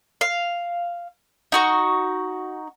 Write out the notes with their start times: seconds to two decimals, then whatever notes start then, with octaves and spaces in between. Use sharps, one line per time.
0.21 F5
1.52 D#4 F#4 C#6